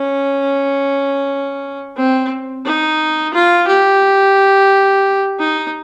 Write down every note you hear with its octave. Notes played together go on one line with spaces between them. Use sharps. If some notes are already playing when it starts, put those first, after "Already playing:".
Already playing: C#4
C4
D#4
F4
G4
D#4